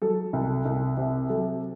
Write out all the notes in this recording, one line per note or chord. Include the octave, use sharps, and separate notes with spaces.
F#3 A4
C2
C2
C3
F#3 A4